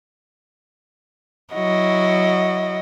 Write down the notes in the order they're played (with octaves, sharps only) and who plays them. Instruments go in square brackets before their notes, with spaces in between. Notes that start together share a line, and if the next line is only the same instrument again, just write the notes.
[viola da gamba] F#3 E4 F#4 [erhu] D#5